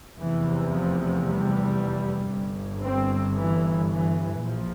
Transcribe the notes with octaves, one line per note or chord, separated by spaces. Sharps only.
F1 E2 C3 E3
F3
G3
G1 G2
C4
E3
E3
A#1 F3